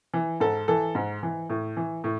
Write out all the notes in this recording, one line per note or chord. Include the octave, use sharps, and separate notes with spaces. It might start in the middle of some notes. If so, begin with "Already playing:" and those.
E3
G#2 A4
E3 A4
G#2
E3
A2
E3
A2